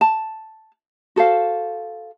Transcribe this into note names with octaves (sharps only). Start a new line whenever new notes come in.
A5
F#4 A4 C5 F5